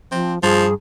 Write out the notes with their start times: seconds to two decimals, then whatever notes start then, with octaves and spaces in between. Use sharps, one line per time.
0.12 F3 C4
0.43 G2 F3 G#4